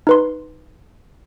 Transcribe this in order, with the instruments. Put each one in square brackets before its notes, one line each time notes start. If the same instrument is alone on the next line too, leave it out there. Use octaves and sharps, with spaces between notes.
[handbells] D#4 B4 C6